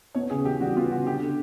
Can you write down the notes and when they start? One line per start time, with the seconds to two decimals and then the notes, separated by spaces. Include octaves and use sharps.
0.15 B3 C#5
0.30 C#3 G#4
0.45 E3 G4
0.61 G3 F#4
0.76 B3 F4
0.91 C#3 F#4
1.07 D3 G4
1.22 D3